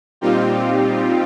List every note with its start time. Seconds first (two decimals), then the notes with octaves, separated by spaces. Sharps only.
0.21 A#2 G3 C4 D#4 F4 G4